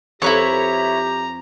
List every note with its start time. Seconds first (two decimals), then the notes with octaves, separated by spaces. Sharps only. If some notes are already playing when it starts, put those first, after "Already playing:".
0.22 F2 E4 G4 B4 C#5 A#5